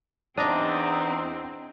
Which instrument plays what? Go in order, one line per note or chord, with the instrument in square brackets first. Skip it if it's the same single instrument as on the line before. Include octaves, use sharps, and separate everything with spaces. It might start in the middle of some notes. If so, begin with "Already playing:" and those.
[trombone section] E2 D#4 [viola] C4 [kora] D4 [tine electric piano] D#5 A#5 D#6